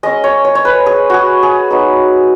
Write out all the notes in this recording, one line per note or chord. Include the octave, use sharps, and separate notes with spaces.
G#3 C#4 D#5
C#5
C#5
C#5
B4
G#4
F#4 G#4
G#4
F#3 B3 D#4